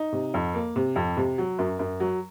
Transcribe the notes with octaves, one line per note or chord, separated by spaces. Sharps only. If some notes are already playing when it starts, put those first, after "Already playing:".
Already playing: D#4
C3
F2
A#3
C3
F2
C3
F#3
F#2
F#2
F#3